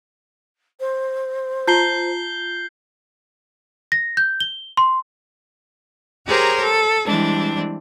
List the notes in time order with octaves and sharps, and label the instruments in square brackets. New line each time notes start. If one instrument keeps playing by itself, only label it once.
[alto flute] C5
[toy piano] F4 A5 A#5 [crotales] G6 C7 G7
[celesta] A#6
G6
G7
C6
[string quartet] G4 G#4 A#4 C5 C#5 A#5
A4
E3 G3 G#3 C4 D4